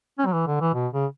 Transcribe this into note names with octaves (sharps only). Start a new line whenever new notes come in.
C#4
F#3
E3
D3
E3
B2
C#3